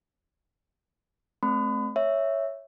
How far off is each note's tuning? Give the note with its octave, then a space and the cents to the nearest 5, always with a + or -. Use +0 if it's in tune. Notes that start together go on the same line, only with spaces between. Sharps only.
A3 -25 C4 +0 B5 +35
C#5 +0 E5 +0